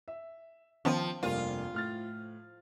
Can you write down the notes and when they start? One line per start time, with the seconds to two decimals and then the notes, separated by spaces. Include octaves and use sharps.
0.08 E5
0.85 D#3 F3 B3 C#4 G5 C6
1.23 F1 G2 A#3 F4
1.74 A2 F6 A6